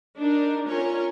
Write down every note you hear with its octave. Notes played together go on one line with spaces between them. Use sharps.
D4 D#4 A#4
C#4 F4 A#4 C#5